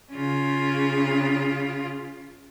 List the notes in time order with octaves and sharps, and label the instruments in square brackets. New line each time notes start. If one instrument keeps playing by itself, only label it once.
[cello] C#3 F4